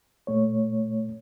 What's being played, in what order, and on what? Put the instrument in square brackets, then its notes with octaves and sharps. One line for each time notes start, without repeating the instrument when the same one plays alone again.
[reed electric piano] A#2 A3 C#5